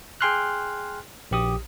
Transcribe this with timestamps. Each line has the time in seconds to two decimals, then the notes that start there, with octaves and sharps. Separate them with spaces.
0.21 G#4 G5 G#5 C6 F6 F#6
1.31 A#1 G4 D#6